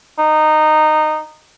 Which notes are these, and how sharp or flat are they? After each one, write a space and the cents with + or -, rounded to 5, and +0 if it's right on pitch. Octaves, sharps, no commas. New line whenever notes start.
D#4 -15